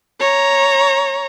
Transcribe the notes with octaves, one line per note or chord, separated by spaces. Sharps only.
C#5 A#5